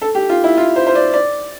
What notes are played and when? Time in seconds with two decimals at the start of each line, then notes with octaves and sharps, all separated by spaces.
0.02 A4
0.15 G4
0.30 F4
0.44 E4
0.58 F4
0.76 C5
0.87 C5
0.95 D5
1.14 D5